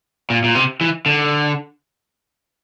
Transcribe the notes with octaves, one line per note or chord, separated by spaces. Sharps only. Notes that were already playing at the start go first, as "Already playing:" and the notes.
A#2
A#2
C3
E3
D3